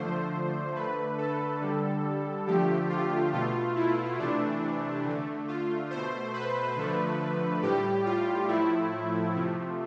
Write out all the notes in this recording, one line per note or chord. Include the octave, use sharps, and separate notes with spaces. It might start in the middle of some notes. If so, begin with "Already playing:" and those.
Already playing: D3 F3 A3 C5
D3 A3 B4
A4
D3 G3
D3 F3 A3 G4
F4
B2 A3 F4
E4
C3 E3 A3 D4
D3 A3
F4
B2 A3 C5
B4
D3 F3 A3
A2 G3 G4
F4
A2 F3 A3 E4
C3 F3 A3